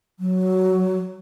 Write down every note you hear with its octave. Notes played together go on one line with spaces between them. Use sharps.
F#3